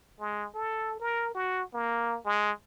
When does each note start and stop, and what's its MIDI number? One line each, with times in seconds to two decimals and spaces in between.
0.20 0.48 56
0.55 1.00 69
1.00 1.32 70
1.34 1.63 66
1.74 2.18 58
2.25 2.51 56